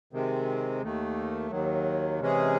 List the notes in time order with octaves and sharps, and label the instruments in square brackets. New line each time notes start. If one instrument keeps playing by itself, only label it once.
[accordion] C3 D#3 G#3 C4
D#2 D#3 A3
D#2 D#3 F#3
C3 E3 G#3 C#4 G#4